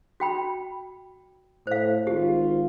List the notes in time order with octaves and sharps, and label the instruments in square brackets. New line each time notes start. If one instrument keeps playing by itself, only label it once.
[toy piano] F#4 G5 B5
[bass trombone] A2 [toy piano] C5 F5
[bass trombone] G#1 [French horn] F4 [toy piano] G4